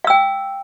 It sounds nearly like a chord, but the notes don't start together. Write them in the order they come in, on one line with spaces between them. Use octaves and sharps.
F5 E6 G5